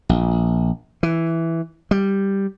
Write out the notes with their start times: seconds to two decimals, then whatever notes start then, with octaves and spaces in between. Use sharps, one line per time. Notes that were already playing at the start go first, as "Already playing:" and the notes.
0.09 A#1
1.03 E3
1.91 G3